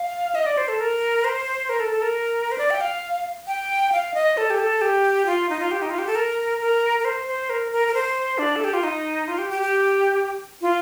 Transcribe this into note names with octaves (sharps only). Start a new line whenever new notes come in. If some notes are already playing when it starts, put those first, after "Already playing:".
Already playing: F5
D#5
D5
C5
A4
A#4
C5
A#4
A4
A4
A#4
C5
D5
G5
F5
G5
F5
D#5
A4
G4
A4
G4
F4
D#4
F4
G4
D#4
F4
G4
A4
A#4
A#4
A#4
C5
C5
A#4
A#4
A#4
C5
D4
A4
G4
F4
D#4
F4
G4
G4
G4
F4